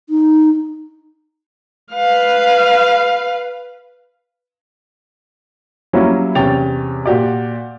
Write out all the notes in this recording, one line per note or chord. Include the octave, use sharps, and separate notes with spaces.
D#4
B4 F5
F#3 G3 A#3 C#4 E4
E2 C3 C#4 G5 A6 F7
A#2 F#4 G4 D5